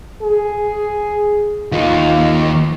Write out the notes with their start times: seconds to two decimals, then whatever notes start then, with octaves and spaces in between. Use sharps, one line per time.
0.22 G#4
1.72 D#2 D#4 F4